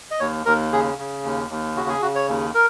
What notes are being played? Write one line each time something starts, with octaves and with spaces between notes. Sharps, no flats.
D#5
D#2 C#5
D#2 A#4
C#3 G#4
C#3
D#2
D#2
C#3 F#4
G#4
C#3 F#4
C#5
D#2
A#4